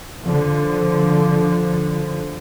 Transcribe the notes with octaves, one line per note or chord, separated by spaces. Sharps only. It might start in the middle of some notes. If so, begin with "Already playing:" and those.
D3 F3